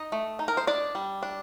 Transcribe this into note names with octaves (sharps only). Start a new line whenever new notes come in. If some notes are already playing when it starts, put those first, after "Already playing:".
Already playing: D#4 D#5
A3
D#4
A#4
C5
D4 D5
G3
D4